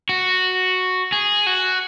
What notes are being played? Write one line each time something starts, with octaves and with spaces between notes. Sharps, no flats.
F#4
G#4
F#4